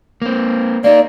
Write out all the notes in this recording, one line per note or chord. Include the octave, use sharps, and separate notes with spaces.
A#3 C4
A#3 D#4 D5